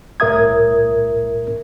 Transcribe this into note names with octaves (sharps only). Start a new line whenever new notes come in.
C2 A2 A#4 E5 D#6 G#6